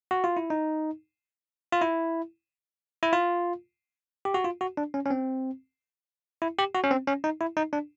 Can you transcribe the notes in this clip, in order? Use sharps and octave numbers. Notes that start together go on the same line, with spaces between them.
F#4
F4
E4
D#4
F4
E4
E4
F4
G4
F#4
F4
F#4
D4
C#4
C#4
C4
E4
G4
F#4
C#4
C4
C#4
D#4
E4
D#4
D4